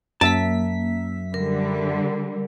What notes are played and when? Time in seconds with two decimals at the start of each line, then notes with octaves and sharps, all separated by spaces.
0.21 F#2 A#3 E5 A5 B6
1.34 D3 G3 A#4